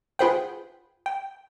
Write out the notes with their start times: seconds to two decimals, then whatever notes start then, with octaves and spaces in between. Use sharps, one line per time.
0.19 F4 G#4 B4 C5 F#5 G5
1.06 G5